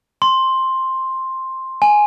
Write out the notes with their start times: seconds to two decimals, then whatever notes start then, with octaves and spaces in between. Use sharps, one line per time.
0.22 C6
1.82 G#5